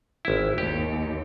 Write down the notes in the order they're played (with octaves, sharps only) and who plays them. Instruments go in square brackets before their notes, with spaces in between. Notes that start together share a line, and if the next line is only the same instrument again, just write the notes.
[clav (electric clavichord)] G#1 E4
[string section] D#2 [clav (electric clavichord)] G4